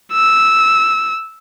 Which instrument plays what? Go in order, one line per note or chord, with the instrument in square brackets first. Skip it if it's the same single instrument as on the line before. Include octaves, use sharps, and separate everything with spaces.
[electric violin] E6